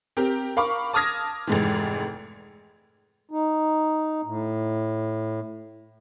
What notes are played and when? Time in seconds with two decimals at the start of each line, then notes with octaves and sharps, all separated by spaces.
0.17 C4 G4 A#4
0.57 A#4 F5 B5 C#6 D6
0.94 A5 D6 D#6 F6 G#6 A#6
1.47 F1 G#2 E3
3.31 D#4
4.25 A2